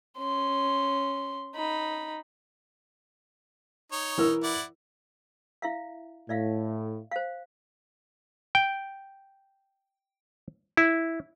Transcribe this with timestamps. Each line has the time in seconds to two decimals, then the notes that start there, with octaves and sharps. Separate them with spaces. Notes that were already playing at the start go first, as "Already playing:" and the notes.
0.19 C#4 C6
1.55 D#4 B5
3.92 D#4 C#5
4.18 E3 A#4 E6
4.43 E4 D5 F#5
5.62 E4 E5 F5
6.29 A2 D5 E5 F5
7.11 C5 F5
8.55 G5
10.77 E4